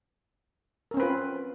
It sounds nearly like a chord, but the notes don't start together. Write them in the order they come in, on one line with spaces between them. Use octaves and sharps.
A#4 C#4 C4 B4 F4